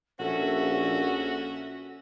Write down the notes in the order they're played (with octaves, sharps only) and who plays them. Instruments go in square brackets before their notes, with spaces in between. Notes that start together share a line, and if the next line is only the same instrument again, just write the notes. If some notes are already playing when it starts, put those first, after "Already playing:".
[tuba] A#1 [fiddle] C#4 E5 [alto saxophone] F#4 [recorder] A4